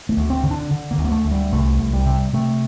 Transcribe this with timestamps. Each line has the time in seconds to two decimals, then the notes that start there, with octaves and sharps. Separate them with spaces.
0.09 A3
0.17 D2
0.30 C4
0.43 D3
0.51 D4
0.71 D3
0.91 A#3
0.98 D2
1.05 A#3
1.12 A3
1.25 D2
1.32 G3
1.52 C2 A3
1.79 C2
1.93 G3
2.06 C3
2.33 C3 A3